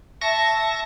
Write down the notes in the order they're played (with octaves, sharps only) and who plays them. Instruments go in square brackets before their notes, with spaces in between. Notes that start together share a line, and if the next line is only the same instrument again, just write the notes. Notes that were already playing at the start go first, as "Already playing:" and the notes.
[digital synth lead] E5 [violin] A5 [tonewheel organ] C#6 A#6